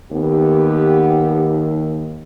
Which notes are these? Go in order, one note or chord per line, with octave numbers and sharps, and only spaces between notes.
D#2 B3 G4